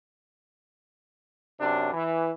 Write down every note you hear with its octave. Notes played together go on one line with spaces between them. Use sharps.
F#2 C3 D4
E3